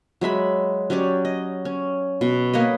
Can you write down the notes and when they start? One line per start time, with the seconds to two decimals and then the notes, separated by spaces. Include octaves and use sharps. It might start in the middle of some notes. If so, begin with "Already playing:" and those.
0.21 F#3 G#3 E5 B5
0.90 F#3 C#4 G4 D5
1.25 D#5
1.65 C#4
2.21 B2
2.54 A#3 B4 C#5 D#5